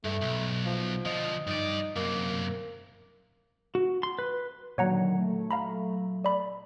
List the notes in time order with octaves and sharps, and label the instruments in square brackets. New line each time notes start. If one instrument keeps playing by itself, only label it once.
[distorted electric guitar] G2 [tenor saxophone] A3
[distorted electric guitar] B1
[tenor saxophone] F3
[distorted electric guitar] D3 F3 [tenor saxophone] D#5
[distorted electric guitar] G2 D5 [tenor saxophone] D#4
[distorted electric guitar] F#2 C3 [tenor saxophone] A#3
[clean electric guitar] F#4
C6
B4
[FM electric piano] A#2 F#3 [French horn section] D3 D#3 [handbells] C#5 F#5 A#5
[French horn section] A3
[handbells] F5 A#5 B5
D5 B5